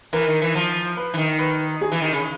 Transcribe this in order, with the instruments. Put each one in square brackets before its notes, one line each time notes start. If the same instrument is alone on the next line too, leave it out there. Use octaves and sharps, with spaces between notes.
[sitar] E3 [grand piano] A#4
[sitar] D#3
E3
F3
[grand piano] B4
[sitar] E3
D#3
[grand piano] B4
G#4
[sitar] E3
D#3
C#3